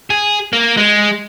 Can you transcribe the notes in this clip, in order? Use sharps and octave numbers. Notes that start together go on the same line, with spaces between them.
G#4
A#3
G#3